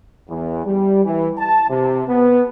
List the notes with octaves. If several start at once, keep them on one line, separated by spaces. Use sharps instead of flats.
E2
G3
E3
A5
C3
B3